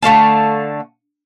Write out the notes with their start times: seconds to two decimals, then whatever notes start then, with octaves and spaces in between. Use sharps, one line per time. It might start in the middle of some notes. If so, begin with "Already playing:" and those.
0.02 D3 A3 F5 A5